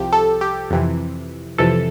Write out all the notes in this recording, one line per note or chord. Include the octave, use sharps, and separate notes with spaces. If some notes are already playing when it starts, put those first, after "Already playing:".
Already playing: C2 C3 F3 G4
A4
G4
F2 C3 E3
F2 C3 E3 A4